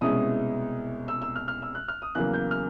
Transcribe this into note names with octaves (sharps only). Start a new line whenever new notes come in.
C2 B2 G#3 C#4 E4 D#6
E6
E6
F6
F6
E6
F#6
F6
D#6
E2 C#3 F#3 A#3 F#6
G6
F6